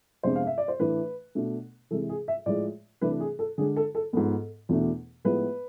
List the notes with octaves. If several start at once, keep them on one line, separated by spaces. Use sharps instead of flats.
F2 C3 G#3 B3 D4 C5
F5
E5
D5
C5
A2 E3 A3 D4 B4
B2 A3 D4
C3 E3 G#3 A4
G#4
E5
A2 F3 G#3 D5
C3 E3 A3 D4 B4
G#4
A4
D3 G#3 D4 G#4
A4
A4
G#2 F3 B3 A4
E2 B2 A3 D4
A2 F3 G#3 B3 B4